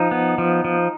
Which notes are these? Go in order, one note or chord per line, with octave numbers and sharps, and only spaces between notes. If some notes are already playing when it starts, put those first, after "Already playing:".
Already playing: F3 D#4
B3
F3
F3